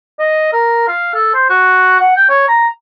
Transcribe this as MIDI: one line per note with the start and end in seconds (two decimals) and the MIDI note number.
0.19 0.48 75
0.53 0.83 70
0.88 1.11 77
1.14 1.30 69
1.34 1.47 72
1.49 1.96 66
2.00 2.12 78
2.16 2.29 79
2.29 2.44 73
2.48 2.67 82